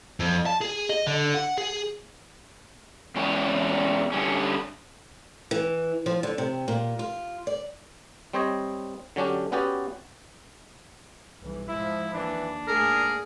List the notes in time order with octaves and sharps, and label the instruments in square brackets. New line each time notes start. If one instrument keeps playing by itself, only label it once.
[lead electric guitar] F2
A5
G#4
D#5
D3
F#5
G#4
[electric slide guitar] E2 G#3 C#4 C#5
D3 G3 C#4
[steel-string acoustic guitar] E3
F3
D3
C3
A#2
F4
D5
[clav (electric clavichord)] G3 C4 C5 C#5 D#5
D3 F#3 C#4 D4 G4
B3 C#4 F#4 G4 B4 D5
[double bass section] B1 G2 E3
[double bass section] G#2 F3 G#3 [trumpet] E4
[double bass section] D#2 [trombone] E3 [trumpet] D4
[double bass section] G#2 A3 A#3 [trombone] G#4 [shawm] A#4